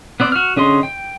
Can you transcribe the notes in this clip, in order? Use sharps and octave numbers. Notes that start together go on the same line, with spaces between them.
B3 C4 D5
F#4 F6
D3 C#4 G#4 D#5 C6
G5